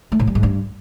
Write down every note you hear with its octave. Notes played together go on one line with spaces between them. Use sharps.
A3
A2
G3
G#2
G2